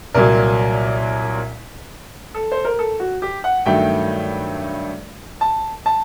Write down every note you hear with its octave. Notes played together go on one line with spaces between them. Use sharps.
C2 A#2 F#3 A#4
A4
C5
A#4
A4
F#4
G4
F#5
G2 D#3 F#3 A3 G5
A5
A5